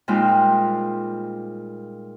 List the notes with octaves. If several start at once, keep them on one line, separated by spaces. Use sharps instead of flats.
A#2 G3 G#3 C4 D#4 F4